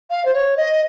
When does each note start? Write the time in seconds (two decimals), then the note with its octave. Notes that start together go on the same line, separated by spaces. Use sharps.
0.10 F5
0.25 C5
0.34 C#5
0.57 D#5